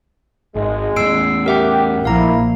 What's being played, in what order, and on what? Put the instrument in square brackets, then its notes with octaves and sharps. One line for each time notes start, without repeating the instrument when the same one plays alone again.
[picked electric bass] G#1 [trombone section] G#3
[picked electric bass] E2 A2 [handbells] E6 C7 D7
[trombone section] G4 [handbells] A#4 E5 F#5
[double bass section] A#1 [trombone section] A#3 E4 [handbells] F5 A#5